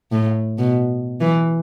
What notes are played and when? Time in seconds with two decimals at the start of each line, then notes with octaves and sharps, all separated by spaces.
0.12 A2
0.59 B2
1.21 E3